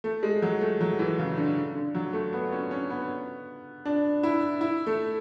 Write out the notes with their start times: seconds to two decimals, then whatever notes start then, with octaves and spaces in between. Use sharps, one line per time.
0.04 A3
0.23 G#3
0.42 F#3
0.61 A3
0.81 F#3
0.99 E3
1.19 C#3
1.37 D3
1.75 D3
1.95 F#3
2.13 A3
2.33 B3
2.52 C#4
2.71 C#4
2.90 B3
3.85 D4
4.23 E4
4.61 E4
4.87 A3